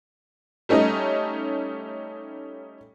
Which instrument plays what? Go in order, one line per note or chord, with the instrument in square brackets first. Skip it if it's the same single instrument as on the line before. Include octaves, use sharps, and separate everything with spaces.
[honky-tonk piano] G3 A3 C#4 D#4 D#5